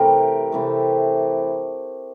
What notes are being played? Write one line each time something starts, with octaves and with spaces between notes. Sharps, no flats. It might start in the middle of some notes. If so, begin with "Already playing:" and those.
Already playing: C3 E3 A3 G4 A#4
C3 E3 A3